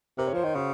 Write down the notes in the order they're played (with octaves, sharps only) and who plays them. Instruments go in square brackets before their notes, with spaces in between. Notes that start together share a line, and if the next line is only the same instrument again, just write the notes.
[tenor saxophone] C3 [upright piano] A#4
[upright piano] C#5
[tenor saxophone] F3 [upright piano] C5
[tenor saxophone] D#3 [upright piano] C5
[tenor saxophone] C#3 [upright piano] F#4